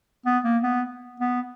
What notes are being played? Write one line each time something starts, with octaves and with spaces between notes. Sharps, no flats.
B3
A#3
B3
B3